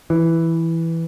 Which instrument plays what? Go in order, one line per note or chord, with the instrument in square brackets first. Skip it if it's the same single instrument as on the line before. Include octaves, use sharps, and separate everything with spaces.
[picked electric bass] E3